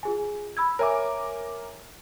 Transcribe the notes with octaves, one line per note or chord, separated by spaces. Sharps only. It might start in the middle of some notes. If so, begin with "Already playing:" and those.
F4 G#4 G#5
B5 E6 G#6
A#4 C#5 E5 G#5 D6